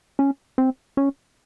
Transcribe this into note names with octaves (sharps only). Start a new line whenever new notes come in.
C#4
C4
C#4